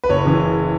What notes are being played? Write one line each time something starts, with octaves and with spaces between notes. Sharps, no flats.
B4
F#1 C#5
C#3 E3